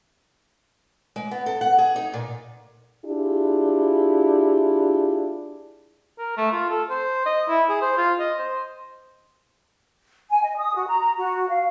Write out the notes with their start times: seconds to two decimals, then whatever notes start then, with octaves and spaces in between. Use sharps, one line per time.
1.16 G#3
1.31 B3
1.46 A4
1.61 F#5
1.78 G#4
1.96 D#4
2.14 A#2
3.05 D4 E4 F4 G4 G#4
6.19 A#4
6.37 A3
6.52 F4
6.70 A4
6.90 C5
7.26 D#5
7.48 E4
7.69 G#4
7.81 C5
7.97 F4
8.20 D#5
8.39 C5
10.28 G#5
10.42 D#5
10.58 D#6
10.75 F#4
10.87 A#5
11.17 F#4
11.49 F5